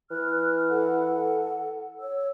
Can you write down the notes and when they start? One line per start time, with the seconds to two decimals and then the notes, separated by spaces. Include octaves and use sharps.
0.11 E3 F6 F#6
0.69 A4 F#5
2.00 C#5 E6